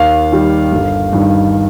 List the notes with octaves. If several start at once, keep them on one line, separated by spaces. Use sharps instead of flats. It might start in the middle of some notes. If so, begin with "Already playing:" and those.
Already playing: D#2 F5
D#3 G3
G1
G2 D#3